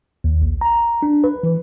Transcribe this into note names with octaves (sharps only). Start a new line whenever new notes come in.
D#2
A#1
A#5
D4
B4
E3